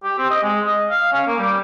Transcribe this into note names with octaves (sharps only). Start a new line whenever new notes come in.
G4
C4
D#5
G#3
D#5
F5
C#4
A#3
G3